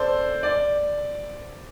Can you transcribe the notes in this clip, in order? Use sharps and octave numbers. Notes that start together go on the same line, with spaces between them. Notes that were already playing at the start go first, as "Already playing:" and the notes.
Already playing: A4 C5 D5
D5